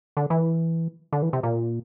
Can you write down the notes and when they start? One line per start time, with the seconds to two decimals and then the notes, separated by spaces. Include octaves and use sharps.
0.17 D3
0.30 E3
1.13 D3
1.22 E3
1.33 C3
1.43 A#2